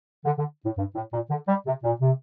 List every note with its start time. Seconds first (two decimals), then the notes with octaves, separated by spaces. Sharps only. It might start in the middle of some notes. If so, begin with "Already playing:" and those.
0.25 D3
0.38 D3
0.65 A2
0.78 G2
0.95 A2
1.13 A#2
1.30 D3
1.48 G3
1.66 C3
1.84 A#2
2.01 C3